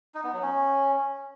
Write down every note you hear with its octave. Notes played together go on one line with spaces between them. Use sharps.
D#4
B3
F#3
C#4